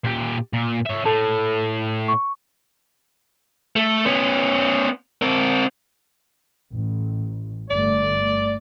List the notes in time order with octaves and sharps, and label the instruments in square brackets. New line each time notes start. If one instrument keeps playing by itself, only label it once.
[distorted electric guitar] A#2 G4
A#2
C#5 E5
[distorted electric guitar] A2 [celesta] A4 A5
[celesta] C#6
[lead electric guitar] A3
B3 C#4
C4 A#4
[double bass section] A1
[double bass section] G1 A3 [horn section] D5